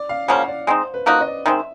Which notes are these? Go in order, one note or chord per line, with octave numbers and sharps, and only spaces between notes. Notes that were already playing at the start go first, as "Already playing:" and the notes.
Already playing: D5
F5
C#3 F3 A#3 C#4 F#5
D5
G#3 C4 D#4 C5
B4
F3 A#3 D#4 F#4 D#5
D#5
D5
D#3 G#3 C4 E5